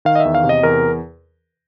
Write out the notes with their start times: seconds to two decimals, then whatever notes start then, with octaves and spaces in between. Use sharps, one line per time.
0.05 D#3 F5
0.15 D#5
0.20 E5
0.25 E2
0.35 F5
0.44 C3
0.49 D#5
0.63 E2 A#4